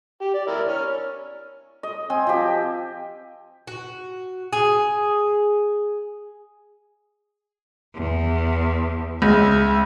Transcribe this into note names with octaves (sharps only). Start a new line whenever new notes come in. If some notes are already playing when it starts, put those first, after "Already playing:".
G4
D5
E4 A#4 D5
C#5 F6
D#5
C4 G#5
F3 G4
F#4
G#4
E2
C#2 E5